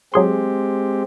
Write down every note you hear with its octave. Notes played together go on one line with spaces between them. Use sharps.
F#3 G#3 C4 G4 G#4 C6